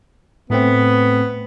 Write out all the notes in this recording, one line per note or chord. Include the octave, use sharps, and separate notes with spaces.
A2 A3 B3 C4